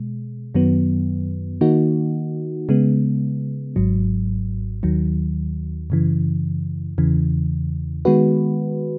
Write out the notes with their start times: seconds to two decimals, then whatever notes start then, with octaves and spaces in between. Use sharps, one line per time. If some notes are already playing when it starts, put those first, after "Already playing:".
Already playing: B2 G#3
0.55 F#2 D#3 F#3 B3
1.61 D#3 A#3 D#4 F#4
2.69 C#3 G#3 B3
3.76 G#1 G#2 F#3
4.83 D#2 D#3 F#3
5.90 F#2 C#3 E3
6.98 E2 C#3 E3
8.05 D#3 G#3 B3 F#4 B4